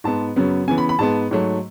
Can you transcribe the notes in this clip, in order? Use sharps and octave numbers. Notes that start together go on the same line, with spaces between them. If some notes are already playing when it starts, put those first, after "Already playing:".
G#2 G#3 B3 A5
F#2 C#3 F#3 B3
C#3 E3 B3 G#5
B5
B5
G#2 G#3 B3 A5
G#2 F#3 A3